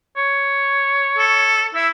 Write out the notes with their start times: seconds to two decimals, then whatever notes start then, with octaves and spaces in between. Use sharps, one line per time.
0.17 C#5
1.19 A4
1.75 E4 E5